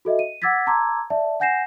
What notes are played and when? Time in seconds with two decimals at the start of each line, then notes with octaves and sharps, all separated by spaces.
0.05 F#4 A4 D#5 E5
0.19 D#7
0.42 F#5 D6 E6 G#6 A6 B6
0.67 A5 A#5 C6 D6 E6 G#6
1.10 D5 E5 A5
1.40 F#5 G#5 G6 A#6 C7 E7